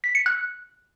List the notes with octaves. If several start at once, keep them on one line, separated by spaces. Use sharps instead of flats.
B6
C#7
F#6